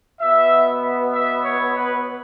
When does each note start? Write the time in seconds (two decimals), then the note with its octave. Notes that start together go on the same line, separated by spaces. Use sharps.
0.20 B2 B3 E5
1.13 E5
1.44 C#5
1.74 B4